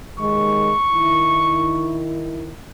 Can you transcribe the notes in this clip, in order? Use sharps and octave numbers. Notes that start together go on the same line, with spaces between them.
D#2 D#3 G#3 C#6
D#3 E4